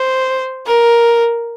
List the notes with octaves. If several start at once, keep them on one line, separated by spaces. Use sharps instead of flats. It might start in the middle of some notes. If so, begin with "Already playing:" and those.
Already playing: C5
A#4